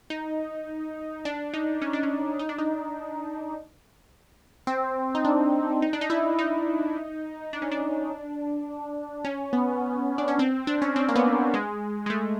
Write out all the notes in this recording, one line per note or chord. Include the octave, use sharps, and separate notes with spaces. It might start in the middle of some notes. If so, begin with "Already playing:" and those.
D#4
D4
D#4
C#4
D4
C#4
D#4
D4
D#4
C4
D#4
D4
D#4
D4
D#4
E4
D#4
D4
C#4
D4
C#4
B3
D4
C#4
C4
D4
C#4
C4
A#3
B3
G#3
G#3
A3